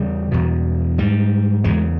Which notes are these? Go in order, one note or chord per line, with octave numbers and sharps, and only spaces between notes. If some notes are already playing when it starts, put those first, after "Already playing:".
Already playing: E2 C#3 G3
E2 B2
G#2 G3
E2 C#3 G#3